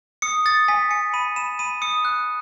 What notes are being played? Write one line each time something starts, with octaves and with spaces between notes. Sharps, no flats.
D#6 C#7
D#6 A6
G#5 B6
G#5 C#7
B5 D#7
B5 E7
B5 D#7
D#6 C#7
F#6